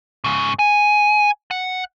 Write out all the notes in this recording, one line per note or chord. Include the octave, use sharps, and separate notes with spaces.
G#2 C#3
G#5
F#5